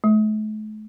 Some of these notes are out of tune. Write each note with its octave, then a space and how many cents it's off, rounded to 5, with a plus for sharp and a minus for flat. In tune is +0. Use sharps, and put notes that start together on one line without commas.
A3 -40